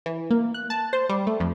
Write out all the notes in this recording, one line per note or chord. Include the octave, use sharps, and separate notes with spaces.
E3
A#3
F#6
A5
C5
G3
A3
F2